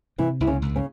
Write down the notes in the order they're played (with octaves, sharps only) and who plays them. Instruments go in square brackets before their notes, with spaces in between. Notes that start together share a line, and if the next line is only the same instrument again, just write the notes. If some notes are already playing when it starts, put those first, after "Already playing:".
[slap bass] C3 [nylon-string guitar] E3 E4
[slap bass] C#2 [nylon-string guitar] E4
[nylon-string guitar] C#3 C#4
[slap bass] C#2
[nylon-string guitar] C#3 C#4